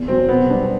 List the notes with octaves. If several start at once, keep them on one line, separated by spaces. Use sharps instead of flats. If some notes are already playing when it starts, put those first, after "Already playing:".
Already playing: E2
C3 F#3 C4
B2 B3
G3 D4